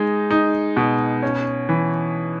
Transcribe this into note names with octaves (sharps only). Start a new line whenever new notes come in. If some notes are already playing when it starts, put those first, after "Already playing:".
Already playing: G#3 D#4
D#4
B2
C#4
E3